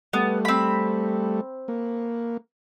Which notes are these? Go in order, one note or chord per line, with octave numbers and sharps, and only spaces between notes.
G3 A3 B3
C4 B5
A#3